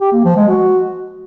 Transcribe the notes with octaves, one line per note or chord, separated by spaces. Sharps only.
G4
A#3
F3
G#3
F#4